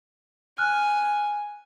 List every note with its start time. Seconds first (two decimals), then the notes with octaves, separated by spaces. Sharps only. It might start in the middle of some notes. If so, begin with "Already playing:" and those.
0.58 G#5 F6 F#6